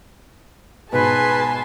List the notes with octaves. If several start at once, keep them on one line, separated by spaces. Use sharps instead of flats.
G#2 B2 G#4 B4 G#5 A5 B5 C6